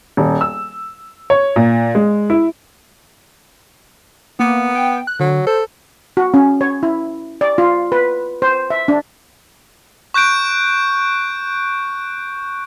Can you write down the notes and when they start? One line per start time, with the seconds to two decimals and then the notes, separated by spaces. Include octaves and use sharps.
0.17 D#1
0.41 E6
1.30 C#5
1.56 A#2
1.95 G#3
2.30 E4
4.39 A#3 B3
4.75 G5
5.07 F#6
5.20 D3 F#3
5.46 A4 C5
6.17 F#4
6.34 C#4
6.61 C#5
6.83 E4
7.41 D5
7.58 F4
7.92 B4
8.42 C5
8.70 E5
8.88 D4
10.14 C#6 F#6 G6 D7